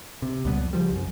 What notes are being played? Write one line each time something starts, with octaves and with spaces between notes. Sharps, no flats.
C3
C#2 B2 G3 B3
F2
C#3 F3 G3
C2 F#2